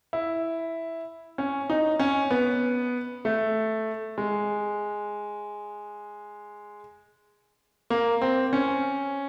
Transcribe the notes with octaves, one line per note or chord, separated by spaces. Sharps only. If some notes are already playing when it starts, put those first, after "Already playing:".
E4
C#4
D#4
C#4
B3
A3
G#3
A#3
C4
C#4